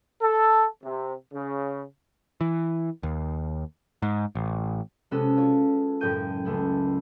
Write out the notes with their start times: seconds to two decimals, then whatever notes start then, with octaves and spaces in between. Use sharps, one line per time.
0.22 A4
0.84 C3
1.34 C#3
2.41 E3
3.03 D#2
4.02 G#2
4.35 A1
5.11 C3 G#3 B3 C#4 F#4 A4
5.36 F4 C#5
6.01 F#1 A2 G5 C#6 G6 D#7
6.45 C#2 A3 B3